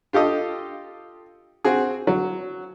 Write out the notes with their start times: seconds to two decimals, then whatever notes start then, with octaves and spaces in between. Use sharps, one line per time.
0.13 F4 G4 A4 D#5
1.64 C4 F#4 G#4
2.07 F#3